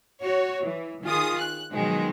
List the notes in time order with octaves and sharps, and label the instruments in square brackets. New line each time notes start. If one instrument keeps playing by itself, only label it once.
[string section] F#4 C#5
E3
D#3 F4 G#4 D#6
F#6
B2 D#3 F3 F#3 G#3